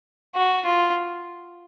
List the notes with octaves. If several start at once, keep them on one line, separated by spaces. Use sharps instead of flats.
F#4
F4